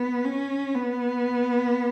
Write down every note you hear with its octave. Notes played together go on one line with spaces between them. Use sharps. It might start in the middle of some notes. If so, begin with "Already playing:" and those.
Already playing: B3
C#4
B3